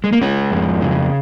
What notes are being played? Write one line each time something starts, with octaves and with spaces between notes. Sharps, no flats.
G#3
A#3
G#3 C#4
F2
C#3